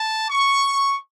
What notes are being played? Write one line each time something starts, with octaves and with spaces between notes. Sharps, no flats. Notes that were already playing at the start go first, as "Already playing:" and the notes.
Already playing: A5
C#6